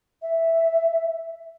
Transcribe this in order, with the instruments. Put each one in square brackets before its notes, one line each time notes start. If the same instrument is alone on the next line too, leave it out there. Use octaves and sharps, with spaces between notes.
[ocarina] E5